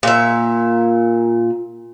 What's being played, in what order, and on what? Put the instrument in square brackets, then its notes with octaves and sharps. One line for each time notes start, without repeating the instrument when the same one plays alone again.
[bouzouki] A#2 E5